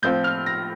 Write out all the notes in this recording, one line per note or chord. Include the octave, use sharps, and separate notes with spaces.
A2 F3 C4 F4 G6
F6
A#6